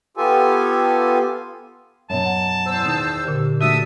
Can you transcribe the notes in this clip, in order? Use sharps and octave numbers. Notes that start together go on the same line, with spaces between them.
B3 F4 G4 A4 G#5
F#2 B2 A5
F#5
E2 C5 E6
D#3 D#4
A#2 D3 G4
A3 D4 F#4 G4 E5 A5 D#6 E6